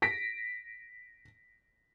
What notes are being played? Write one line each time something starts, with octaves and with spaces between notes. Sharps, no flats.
A#6 B6 D7